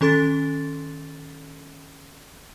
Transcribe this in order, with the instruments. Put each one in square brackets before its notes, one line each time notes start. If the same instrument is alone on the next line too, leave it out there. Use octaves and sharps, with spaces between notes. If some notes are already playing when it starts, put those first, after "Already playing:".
[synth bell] D#3 C#4 A4 C6 A6